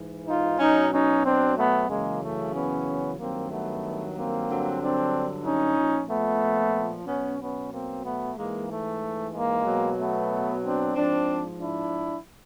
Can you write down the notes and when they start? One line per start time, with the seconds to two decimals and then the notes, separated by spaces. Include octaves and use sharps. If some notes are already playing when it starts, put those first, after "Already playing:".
Already playing: G#2 E3
0.26 D#4 F4
0.58 B2 F#3 C#4 D#4
0.90 C#4 D#4
1.23 C4 D4
1.55 A3 B3
1.87 F#2 C#3 E3 G#3 A#3
2.20 A3
2.52 B3 C#4
3.17 G2 D#3 F#3 A#3 C4
3.49 A3 B3
4.14 A#3 C4
4.47 G2 D3 F#3
4.80 C4 D4
5.44 C#4 D#4
5.76 A#2 F3
6.08 A3 B3
7.06 B2 F#3 B3 C#4
7.38 B3 C#4
7.71 A#3 C4
8.02 A3 B3
8.35 G#2 E3 G#3 A#3
8.68 A3
9.32 G#3 A#3
9.64 B2 F#3
9.97 A3 B3
10.63 C4 D4
10.94 G#2 F3 C4 D4
11.59 D4 E4